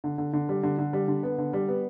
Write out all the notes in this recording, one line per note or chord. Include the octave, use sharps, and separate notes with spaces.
D3
D3
D3
G3
D3
D3
G3
D3
B3
D3
G3
B3